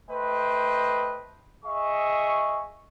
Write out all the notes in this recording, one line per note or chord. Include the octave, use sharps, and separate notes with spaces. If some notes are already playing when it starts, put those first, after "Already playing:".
A3 B4 C5 D#5 G5
G#4 D#5 E5 C#6